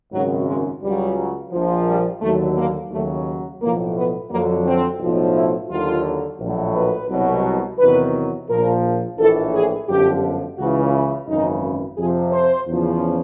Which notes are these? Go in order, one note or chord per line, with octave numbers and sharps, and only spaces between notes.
G#1 F#2 C#3 F#3
G#3
C#2 C#3 F#3 G3
A#1 A#2 F3
G3
D#2 D3 F#3 A3
A#3
D#2 C#3 F#3 A3
B1 A2 F3 A#3
B3
F2 D3 F#3 A#3
C4
B1 A2 F3
E4
D#2 D3 F#3 F4
A#1 A2 F#3
B4
C2 B2 F#3
E2 C3 D#3 F#3 B4
A#1 A#2 F3 A#4
A#1 A2 E3 A4
G#4
G1 F#2 D3 F3 G4
C#2 C#3 E3 F#4
E4
G#1 F#2 C#3 E3 D#4
F2 C3 F3 G#4
C5
E2 C#3 F3